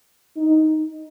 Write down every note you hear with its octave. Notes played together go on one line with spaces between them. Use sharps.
D#4